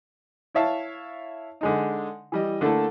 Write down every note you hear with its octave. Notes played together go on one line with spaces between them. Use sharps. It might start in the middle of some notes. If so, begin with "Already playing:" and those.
E4 C#5 E5 F5 A5
D3 G#3 D#4
E3 G3 D#5
D3 A3 A#3 D4 E4 A4